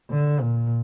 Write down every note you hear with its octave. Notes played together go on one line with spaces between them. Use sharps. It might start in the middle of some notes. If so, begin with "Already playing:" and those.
D3
A#2